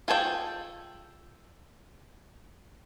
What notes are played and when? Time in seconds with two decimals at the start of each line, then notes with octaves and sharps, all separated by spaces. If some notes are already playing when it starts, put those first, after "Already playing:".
0.08 F4 G#4 A4 C#5 G5